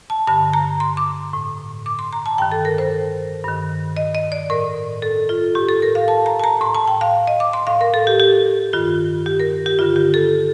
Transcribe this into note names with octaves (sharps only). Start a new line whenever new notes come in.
A5
G2 D3 A5
A#5
C6
D6
A2
D6
C6
A#5
A5
G2 D#3 G5
A4
A#4
C5
G2 D#3
D#5
D#5
D5
A2 A#4
A4
F4
A2 G4
A4
A#4
F5
A5
A#5
A5
A#5
A2 C6
A5
G5
F5
D#5
D6
C6
A2 F5
A#4
A4
G4
G4
G2 D#3 F4
G4
A#4
G4
G2 D3 F4
G4
A4